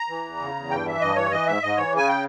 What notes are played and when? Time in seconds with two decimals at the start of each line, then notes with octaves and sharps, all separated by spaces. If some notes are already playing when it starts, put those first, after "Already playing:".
Already playing: A#5
0.09 E3
0.25 E2
0.40 C#3
0.55 E2
0.70 G2 G5
0.86 E3 E5
1.01 G2 D#5
1.16 E3 C#5
1.31 E3 D#5
1.46 G#2 E5
1.62 G#2 D#5
1.77 E3 C#5
1.93 C#3 G#5
2.08 G5